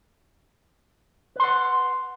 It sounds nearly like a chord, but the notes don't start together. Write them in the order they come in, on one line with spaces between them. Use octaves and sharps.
B4 C6 F#5